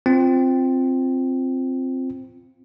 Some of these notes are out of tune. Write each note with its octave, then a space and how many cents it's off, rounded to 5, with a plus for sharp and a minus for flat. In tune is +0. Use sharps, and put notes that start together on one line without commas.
C4 +0 F4 +0